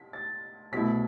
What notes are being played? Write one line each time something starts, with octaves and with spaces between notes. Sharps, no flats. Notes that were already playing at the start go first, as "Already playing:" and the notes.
Already playing: B6
A6
C2 B2 A3 E4 B6